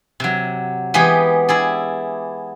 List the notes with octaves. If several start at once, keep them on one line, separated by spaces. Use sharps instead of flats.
C3 F#3
E3 G#3 B3 G4 G#4
E4 G#4 D5